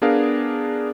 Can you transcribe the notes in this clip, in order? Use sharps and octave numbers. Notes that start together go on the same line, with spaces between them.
B3 D4 G#4 A#4 F5